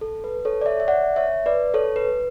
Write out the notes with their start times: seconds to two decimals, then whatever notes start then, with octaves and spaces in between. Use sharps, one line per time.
0.01 A4
0.24 B4
0.45 A4 C#5
0.61 D5
0.66 C#5 E5
0.80 E5
0.88 D5 F#5
1.16 C#5 E5
1.46 B4 D5
1.74 A4 C#5
1.96 B4